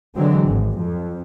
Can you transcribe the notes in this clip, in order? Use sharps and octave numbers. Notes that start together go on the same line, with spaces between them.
D3 E3 F#3 G#3 C4
G#1
F2